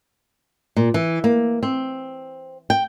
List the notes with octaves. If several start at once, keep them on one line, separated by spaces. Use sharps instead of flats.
A#2
E3
A#3
C4
G5